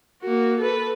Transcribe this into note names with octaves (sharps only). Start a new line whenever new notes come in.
A#3 F#4
A4 B4